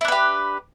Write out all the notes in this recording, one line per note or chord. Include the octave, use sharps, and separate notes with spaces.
D4 E4 G4 B4